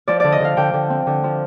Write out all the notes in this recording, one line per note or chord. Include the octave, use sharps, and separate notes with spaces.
F3 D5
D3 D5
D#5
D3 F5
D3 G5
D3
C4
D3
F3